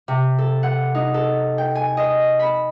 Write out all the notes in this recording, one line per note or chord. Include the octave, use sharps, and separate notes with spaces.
C3
A4
F#5
D#4
A4
G5
G#5
D#5
B5